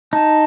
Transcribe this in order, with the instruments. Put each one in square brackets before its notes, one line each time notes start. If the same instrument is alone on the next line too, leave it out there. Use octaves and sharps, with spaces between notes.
[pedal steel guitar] D#4 [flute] A5